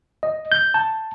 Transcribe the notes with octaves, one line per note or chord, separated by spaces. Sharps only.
D#5
G6
A5